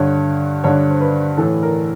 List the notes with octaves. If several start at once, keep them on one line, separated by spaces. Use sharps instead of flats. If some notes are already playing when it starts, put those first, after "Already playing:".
Already playing: G2 D3 C#5
G2 D3 C#5
C5
B4
A2 E3 A4
A#4